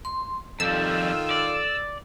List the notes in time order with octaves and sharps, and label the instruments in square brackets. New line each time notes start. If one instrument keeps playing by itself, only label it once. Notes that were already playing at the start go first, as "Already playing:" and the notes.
[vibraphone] C6
[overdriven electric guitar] F2 G3 [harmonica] D#3 F4 [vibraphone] A4 [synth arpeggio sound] E6
[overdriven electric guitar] D5